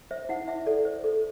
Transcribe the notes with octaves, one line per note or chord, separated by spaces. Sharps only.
C5 E5
E4 F#5
E4 E5
A4 D5
C5
A4